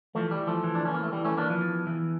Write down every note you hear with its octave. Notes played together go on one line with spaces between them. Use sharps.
E3 F3 A3
G3
E3
F3 A3
E3
D4
E3 C#4
A#3
A3
E3 G3
A3 C#4
E3 A#3 D4
F3
E2
E3